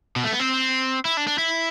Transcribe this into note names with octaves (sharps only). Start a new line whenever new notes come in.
B2
A3
B3
C4
E4
D4
D4
E4